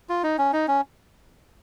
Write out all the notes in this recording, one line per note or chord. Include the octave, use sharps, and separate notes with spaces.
F4
D#4
C#4
D#4
C#4